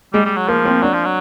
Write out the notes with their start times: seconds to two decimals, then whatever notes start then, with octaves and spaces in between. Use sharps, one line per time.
0.13 G3 G#3
0.25 G3
0.37 F#3
0.48 F3 A#3
0.65 C4
0.82 F#3 D4
0.93 F3
1.05 F#3